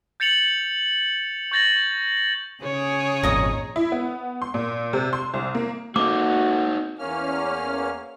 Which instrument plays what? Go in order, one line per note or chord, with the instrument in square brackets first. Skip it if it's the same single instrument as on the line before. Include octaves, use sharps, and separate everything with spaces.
[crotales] G6 A6 C#7 F7 F#7
C#6 G6 A6 A#6 F#7
[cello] C#3 G#4 [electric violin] C#5
[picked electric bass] G#1 F2 A#2 [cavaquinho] D#5 A#5
[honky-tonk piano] E4
B3
C6
A#2
C3
C6
C2
A#3
[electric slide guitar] A#3 A4 [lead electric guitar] C4 D#4 [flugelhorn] F#4 [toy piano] D6
[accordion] E2 A#3 C#4 F6